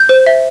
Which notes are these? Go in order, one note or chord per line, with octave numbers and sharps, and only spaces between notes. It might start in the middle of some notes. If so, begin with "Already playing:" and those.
Already playing: G6
C5
E5